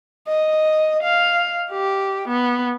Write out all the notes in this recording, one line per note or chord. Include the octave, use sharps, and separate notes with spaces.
D#5
F5
G4
B3